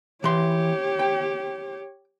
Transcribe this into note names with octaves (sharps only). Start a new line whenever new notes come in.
E3 G4 C#5 C6
G5